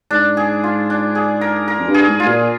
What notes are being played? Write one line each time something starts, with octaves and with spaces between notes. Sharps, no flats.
G#2 D4
G#4
F4
D4
G#4
A#4
A#4
F2
G2
G#4
G#2
G#2 F4
A#2